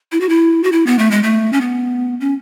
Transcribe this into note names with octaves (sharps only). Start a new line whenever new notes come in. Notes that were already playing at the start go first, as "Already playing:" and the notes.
E4
F#4
E4
F#4
E4
B3
A3
G#3
A3
C#4
B3
C#4